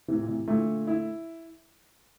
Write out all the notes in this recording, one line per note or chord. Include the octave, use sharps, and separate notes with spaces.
A2 C3 E3
A#2
A2 C3
A#2 D3 A3
E4